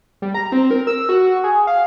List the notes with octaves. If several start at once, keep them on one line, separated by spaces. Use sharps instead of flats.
G3
A#5
C4
A#4
E6
F#4
G#4
F5